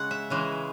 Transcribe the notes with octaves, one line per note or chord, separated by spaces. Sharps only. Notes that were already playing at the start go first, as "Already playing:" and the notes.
Already playing: C#3 G#3 F#5
E5
C#3 E3 G#3